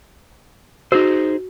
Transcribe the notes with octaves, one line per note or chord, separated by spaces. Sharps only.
D#4 F#4 G#4 C5